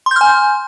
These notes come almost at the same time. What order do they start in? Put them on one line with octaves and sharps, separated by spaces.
C6 G6 F6 G#5